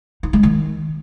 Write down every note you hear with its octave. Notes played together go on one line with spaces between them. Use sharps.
D#4
G#3
D#3